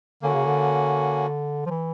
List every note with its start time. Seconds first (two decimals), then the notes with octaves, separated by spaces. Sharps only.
0.22 D3 A#3 C#4 F#4
0.34 C#3
0.45 D3
1.66 F3
1.70 E3